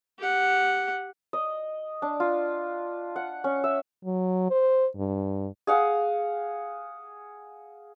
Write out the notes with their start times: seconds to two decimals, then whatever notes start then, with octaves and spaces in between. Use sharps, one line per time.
0.18 G4 F#5
1.33 D#5
2.02 D4
2.20 F4
3.16 F#5
3.44 C#4
3.64 E5
4.05 F#3
4.51 C5
4.97 G2
5.67 G#4 F5 F#5